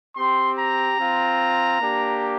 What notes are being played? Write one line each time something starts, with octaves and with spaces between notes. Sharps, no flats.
C4 G4 C6
A#5
C4 F4
A#3 D4 G4